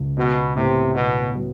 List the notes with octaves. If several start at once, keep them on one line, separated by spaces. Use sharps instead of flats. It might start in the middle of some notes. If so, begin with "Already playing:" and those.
Already playing: C#2
B2 B3
A2 C3
B2 B3
F#3